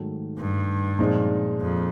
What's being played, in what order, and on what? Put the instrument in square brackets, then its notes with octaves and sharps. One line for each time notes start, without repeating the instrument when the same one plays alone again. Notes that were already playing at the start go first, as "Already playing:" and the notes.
Already playing: [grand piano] G#2 D#3 F#3 A3
[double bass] G2
[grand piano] A#2 F3 G#3 C4 D#4
[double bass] F2